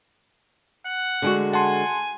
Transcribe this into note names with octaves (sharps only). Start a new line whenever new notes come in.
F#5
D3 G#3 F#4
F#5 G#5 A5 C6